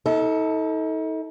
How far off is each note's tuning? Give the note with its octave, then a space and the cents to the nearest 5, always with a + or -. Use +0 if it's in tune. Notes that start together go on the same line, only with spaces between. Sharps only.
D#4 +40 A4 +0